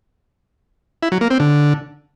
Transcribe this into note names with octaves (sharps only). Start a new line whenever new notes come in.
E4
F#3
A#3
C4
D3